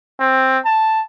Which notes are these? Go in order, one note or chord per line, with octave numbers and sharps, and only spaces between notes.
C4
A5